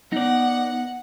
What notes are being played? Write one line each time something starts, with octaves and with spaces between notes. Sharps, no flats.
B3 D#4 D5 F#5